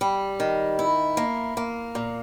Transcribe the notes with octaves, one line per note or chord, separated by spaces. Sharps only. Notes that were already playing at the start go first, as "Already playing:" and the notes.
G3
D#3
E4
A#3
A#3
A#2